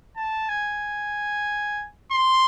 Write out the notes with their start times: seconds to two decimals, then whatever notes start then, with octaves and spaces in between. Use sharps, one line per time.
0.16 A5
0.48 G#5
2.12 C6